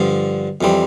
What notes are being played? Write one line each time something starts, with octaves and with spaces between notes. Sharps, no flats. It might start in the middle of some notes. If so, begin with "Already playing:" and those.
Already playing: G2 D3 F3
F2 E3 G3 C4